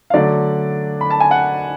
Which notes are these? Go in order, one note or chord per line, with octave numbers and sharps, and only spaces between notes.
F5
D3 F#3 A3 D5
B5
A5
G#5
F#5